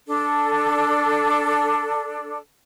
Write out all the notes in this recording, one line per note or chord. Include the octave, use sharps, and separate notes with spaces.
D4 A4